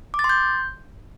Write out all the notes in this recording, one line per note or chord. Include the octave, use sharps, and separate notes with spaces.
D6
A6
C6
G6